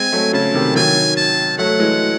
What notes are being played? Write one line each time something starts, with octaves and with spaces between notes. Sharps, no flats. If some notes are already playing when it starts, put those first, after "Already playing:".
Already playing: G#3 C4 G#5
F#3 A3
C#3 A5
C3 D#3
D#3 F#3 G#5
A5
F#3 A3 F#5
E3 G#3